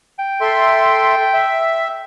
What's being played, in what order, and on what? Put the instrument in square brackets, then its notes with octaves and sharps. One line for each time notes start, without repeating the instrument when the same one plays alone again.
[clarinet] G5
[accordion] A4 E5 C6
E5